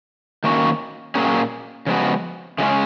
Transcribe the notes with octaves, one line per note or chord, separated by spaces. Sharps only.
D#3 A#3 C#4 F#4
A#2 F#3 A#3 C#4 G#4
C#3 F3 G#3 B3 F#4
C#3 F3 G#3 C#4